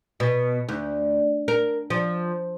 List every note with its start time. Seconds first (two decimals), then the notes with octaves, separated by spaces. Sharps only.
0.20 B2
0.68 D2
1.48 A#4
1.90 F3